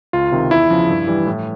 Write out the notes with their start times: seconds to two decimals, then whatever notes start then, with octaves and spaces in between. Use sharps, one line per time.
0.13 C#2 F4
0.32 C3 D#3
0.51 E2 E4
0.70 C#3 F3
0.89 G2
1.08 E3 G3
1.26 A2